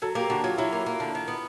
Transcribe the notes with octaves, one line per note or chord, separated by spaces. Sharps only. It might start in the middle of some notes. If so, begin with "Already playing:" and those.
F#3 A4
A#3 G4
D3 F#4
F#3 F4
F#3 E4
A#3
A#3
D3
D#3
B3